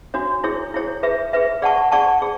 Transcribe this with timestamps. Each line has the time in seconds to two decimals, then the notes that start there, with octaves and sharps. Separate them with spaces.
0.14 D4 F#4 C#5
0.44 E4 G#4 C#5
0.74 E4 G#4 C#5
1.03 G#4 B4 E5
1.33 G#4 B4 E5
1.62 G#4 D5 F#5 A5 C#6
1.92 G#4 D5 F#5 A5 C#6
2.22 G#4